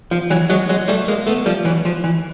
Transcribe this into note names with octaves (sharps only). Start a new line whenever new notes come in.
F3
E3 F#3
F#3 G#3
F#3 G#3
G3 A3
G#3 A#3
A3 B3
F3 G3
E3 F#3
F3
E3